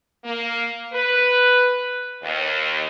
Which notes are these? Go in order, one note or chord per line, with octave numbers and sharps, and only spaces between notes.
A#3
B4
D#2